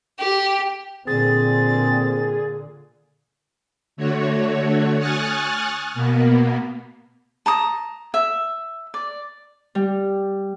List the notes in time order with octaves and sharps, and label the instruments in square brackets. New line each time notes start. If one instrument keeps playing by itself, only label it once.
[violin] G4
[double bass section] A#2 D3 [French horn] C4 [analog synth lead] G#4 [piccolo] A6
[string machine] D3 A3 F#4 C#5
G#5 C#6 D#6 F6 F#6 A6
B2 A#3 B3
[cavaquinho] A5 A#5 D#6
E5
D5
[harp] G3